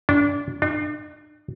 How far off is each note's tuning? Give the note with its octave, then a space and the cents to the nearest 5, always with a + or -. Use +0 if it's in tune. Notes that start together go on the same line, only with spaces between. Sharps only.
D4 -25
D4 +40